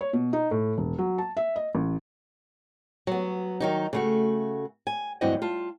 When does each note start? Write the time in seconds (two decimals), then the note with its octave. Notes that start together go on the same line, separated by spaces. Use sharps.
0.01 C#5
0.13 B2
0.33 D#4
0.51 A2
0.78 E1
0.98 F#3
1.18 A5
1.37 E5
1.56 D#5
1.75 A1
3.07 F#3 B3
3.60 D#3 F#3 D#4
3.93 C#3 A3 F#4
4.87 G#5
5.21 D2 G2 E3 F#3 C4 D#5
5.42 F4 A5